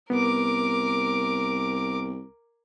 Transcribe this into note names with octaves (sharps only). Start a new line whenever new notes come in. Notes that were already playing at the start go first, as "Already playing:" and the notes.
C2 B3 A#4 D6